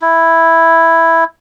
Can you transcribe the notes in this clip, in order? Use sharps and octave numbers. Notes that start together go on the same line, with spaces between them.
E4